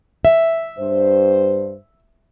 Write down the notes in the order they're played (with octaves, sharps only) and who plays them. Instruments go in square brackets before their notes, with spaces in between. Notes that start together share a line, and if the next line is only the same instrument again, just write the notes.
[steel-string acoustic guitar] E5
[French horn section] G2 C5